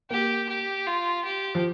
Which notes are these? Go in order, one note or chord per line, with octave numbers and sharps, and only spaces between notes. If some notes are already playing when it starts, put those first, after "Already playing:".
A#3 G4
G4
F4
G4
F3